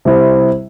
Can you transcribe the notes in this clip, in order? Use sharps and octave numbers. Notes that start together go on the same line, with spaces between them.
C3 G3 C4 E4